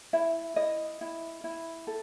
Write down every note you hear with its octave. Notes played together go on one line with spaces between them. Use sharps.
E4 E5
E4 D#5
E4
E4
A4